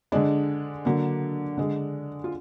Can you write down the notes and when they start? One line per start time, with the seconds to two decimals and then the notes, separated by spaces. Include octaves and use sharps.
0.12 D3 G#3 D4
0.85 D3 F#3 A#3
1.57 D3 G#3
2.24 F4